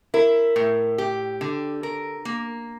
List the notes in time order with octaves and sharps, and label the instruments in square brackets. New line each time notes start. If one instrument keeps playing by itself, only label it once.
[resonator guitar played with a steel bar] E4 [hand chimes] A#4
[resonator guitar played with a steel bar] A2
G4
D3
A#4
A#3